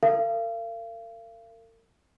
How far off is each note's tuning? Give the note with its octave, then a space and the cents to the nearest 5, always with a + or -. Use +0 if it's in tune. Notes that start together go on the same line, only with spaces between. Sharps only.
A#4 -45 F5 -40